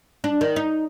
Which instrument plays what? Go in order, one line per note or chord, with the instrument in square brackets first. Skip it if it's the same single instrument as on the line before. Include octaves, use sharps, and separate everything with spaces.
[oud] D4
D#3
D#4